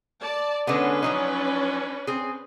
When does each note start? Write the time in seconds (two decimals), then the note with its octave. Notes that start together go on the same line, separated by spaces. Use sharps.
0.20 D5 A5
0.67 D3 G#3 B3 C#4 D4 B4
1.03 F3 F#3 D#4
2.07 C4 G#4